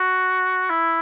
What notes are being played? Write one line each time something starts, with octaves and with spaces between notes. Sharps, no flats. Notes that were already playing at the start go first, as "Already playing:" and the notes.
Already playing: F#4
E4